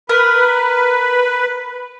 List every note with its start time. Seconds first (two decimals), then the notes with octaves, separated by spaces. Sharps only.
0.09 A#4 B4